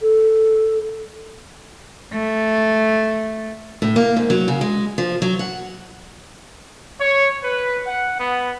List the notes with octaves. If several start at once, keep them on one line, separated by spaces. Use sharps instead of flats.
A4
A3
A2
A#3
G#2
F#3
C#3
G#3
F3
F#3
F#5
C#5
B4
F#5
B3